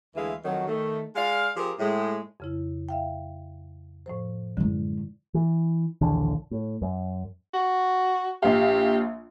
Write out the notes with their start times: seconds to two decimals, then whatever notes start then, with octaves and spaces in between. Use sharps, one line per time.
0.15 D2 E3 G#3 E4 F5
0.45 F2 D#3 F#3
0.67 D#3 A3
1.15 G#3 D5 F5
1.56 F3 C4 G4 G#4 A#4
1.79 A2 G#3
2.40 F2 C#3 E4
2.89 E5 F5 G5
4.06 A2 F3 C5
4.57 F#2 D3 G#3 E4
5.34 E3
6.01 A#1 D#2 D3 E3
6.51 A2
6.82 F#2
7.54 F#4
8.42 A#1 G4 F5